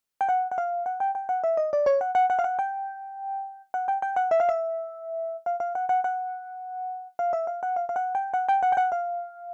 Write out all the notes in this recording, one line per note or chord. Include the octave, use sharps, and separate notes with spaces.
G5
F#5
F#5
F5
F#5
G5
G5
F#5
E5
D#5
D5
C#5
F#5
F#5
F#5
F5
F#5
G5
F#5
G5
G5
F#5
E5
F5
E5
F5
F5
F#5
F#5
F#5
F5
E5
F5
F#5
F5
F5
F#5
G5
F#5
G5
F#5
G5
F#5
F5